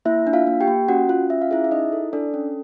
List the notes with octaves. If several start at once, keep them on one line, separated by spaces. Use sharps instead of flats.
A#3 E4 E5
D4
F4 F5
A#3
G4 G5
A#3
C#4 F#4 F#5
F4
C#4 E5
F5
E4 G#4 E5
E5
D#4 E4 D#5
A4
D4 A4 D5
C#4